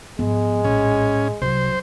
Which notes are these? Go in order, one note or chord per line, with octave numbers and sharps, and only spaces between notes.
G#2 F3 G#3 B3
A#1 A2 C#4
C2 C3 F#3 C5